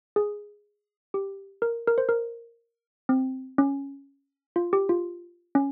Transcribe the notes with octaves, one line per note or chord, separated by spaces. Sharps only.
G#4
G4
A#4
A#4
C5
A#4
C4
C#4
F4
G4
F4
C#4